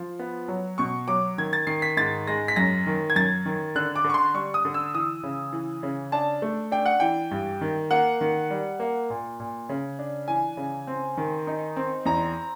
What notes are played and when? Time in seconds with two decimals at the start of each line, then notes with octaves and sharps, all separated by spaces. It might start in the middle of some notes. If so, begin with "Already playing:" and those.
Already playing: F3
0.19 B3
0.48 F#3
0.78 B2 C#6
1.08 F#3 D6
1.38 D#3 G#6
1.53 A6
1.67 D#3 C7
1.82 B6
1.97 G#2 A6
2.27 G#3 A#6
2.48 B6
2.56 F#2 A#6
2.87 D#3
3.10 G#6
3.16 F#2 A6
3.46 D#3
3.75 D3 F#6
3.96 D6
4.04 D3
4.10 C#6
4.14 C6
4.34 G3 C#6
4.54 D#6
4.65 D3
4.74 E6
4.94 E3 D#6
5.23 C#3
5.53 E3
5.83 C#3
6.12 D4 A5
6.42 A3
6.72 D4 G5
6.86 F#5
7.00 E3 G5
7.31 G2
7.61 D#3
7.91 A#3 F#5
8.21 D#3
8.50 G3
8.80 A#3
9.10 A#2
9.40 A#2
9.69 C#3
9.99 D4
10.28 E3 G#5
10.57 C#3
10.87 C4
11.17 D#3
11.47 D#4
11.76 C4
12.05 E2 A#5